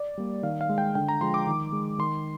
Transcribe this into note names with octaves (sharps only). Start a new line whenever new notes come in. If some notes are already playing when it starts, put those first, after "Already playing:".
Already playing: D5
G3 A#3
D#3 F5
F5
G#3
G5
D3 G5
A#5
F3 G#3 C6
D6
D#3
G#3
D#3 C6